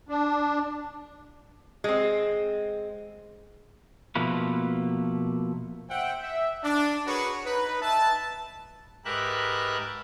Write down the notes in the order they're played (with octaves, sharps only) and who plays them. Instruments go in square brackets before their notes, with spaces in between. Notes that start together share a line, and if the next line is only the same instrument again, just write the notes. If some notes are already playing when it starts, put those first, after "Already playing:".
[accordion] D4
[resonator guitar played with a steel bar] G#3 C4
[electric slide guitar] B2 F3 A3 A#3 B4
[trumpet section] C5 E5 F#5 G5
E5
D4
F#4 G#4 A#4 B4 C#5 C#6
D#4 B4
D#4 B4 E5 A5
[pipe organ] G#2 G4 A#4 B4 E5 F#6